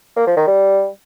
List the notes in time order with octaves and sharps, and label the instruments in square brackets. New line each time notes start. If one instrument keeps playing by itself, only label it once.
[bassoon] A#3
F3
D#3
G3